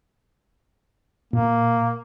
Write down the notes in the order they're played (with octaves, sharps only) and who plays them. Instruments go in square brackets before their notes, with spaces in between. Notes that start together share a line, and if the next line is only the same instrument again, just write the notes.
[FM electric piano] A#2 [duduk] A#3